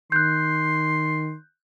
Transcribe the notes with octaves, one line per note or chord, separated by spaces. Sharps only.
D#3 C6 F#6 G6